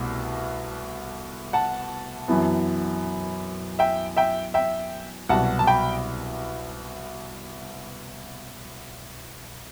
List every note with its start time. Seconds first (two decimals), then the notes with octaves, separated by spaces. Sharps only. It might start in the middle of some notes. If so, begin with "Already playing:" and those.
Already playing: C2 B2 A3
1.53 F#5 A5
2.28 F#2 E3 B3
3.79 E5 G5
4.16 E5 G5
4.54 E5 G5
5.29 C2 B2 F#3 F#5 A5
5.59 A5
5.67 G5 B5